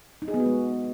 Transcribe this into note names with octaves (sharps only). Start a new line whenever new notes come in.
D#4
G#4
B3
F#4
G#3